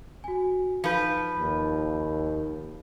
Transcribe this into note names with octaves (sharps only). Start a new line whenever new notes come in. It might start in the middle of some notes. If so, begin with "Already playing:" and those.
F#4 G#5
F3 D#4 B4 B5 G6
D#2